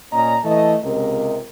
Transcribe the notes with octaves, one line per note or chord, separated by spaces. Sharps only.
A#2 C#4 D5 D#5 A#5
E3 A3 D#5 A5
C#2 C3 A#4 D#5